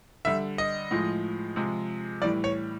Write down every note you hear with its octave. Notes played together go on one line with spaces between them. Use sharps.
D3 G3 E5
D#5
A2 F3 G#3
C3 F3 G#3
A2 E3 G3 D5
C#5